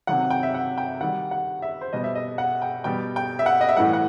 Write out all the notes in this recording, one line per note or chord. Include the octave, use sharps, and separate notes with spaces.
C3 D#3 F#3 F#5
G5
E5
F#5
G5
D#3 G3 F#5
F#5
E5
C5
B2 G3 D#5
E5
D#5
F#5
G5
B2 G3 G5
G5
E5
F#5
D#5
E5
A2 E3 G3 F#5
F#5